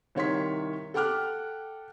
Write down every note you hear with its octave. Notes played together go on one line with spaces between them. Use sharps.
C2 D#3 C#5 C6 B6
A4 F#5 G5 D6 F6 F#6